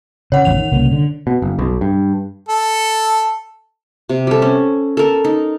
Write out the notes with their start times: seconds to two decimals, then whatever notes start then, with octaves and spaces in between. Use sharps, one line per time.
0.32 C#3 C#5 F#5
0.45 A1 E2 F3 F7
0.56 D#3
0.72 C2 C#3 A#3
0.92 D3
1.27 B2
1.42 F#1
1.59 B1
1.81 G2
2.49 A4
4.09 C3
4.27 G3 A4
4.42 C#4
4.97 A4 A#4
5.24 D#4